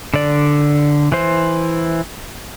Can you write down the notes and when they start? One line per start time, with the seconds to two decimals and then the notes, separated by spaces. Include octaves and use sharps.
0.14 D3 D5
1.12 E3 C5